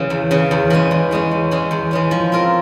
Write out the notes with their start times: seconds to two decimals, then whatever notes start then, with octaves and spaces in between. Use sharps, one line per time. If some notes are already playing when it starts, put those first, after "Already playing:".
Already playing: C#3 E3
0.10 E2
0.31 C#3 E3
0.51 E2
0.70 E3 G#3 C#4
0.91 E2
1.11 E3 G#3 C#4
1.31 E2
1.51 E3 G#3 C#4
1.71 E2
1.91 E3 G#3 C#4
2.11 F3
2.32 C4 F4 A#4